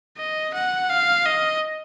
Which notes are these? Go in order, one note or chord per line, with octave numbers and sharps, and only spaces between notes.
D#5
F#5
F5
D#5